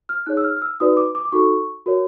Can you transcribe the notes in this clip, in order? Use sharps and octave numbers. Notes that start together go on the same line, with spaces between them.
F6
D#4 G#4 C#5 F#6
E6
F6
F6
E6
D#4 F#4 B4 D5 D#6
D6
D6
D6
D#4 F#4 A4 C#6
F#4 A#4 C#5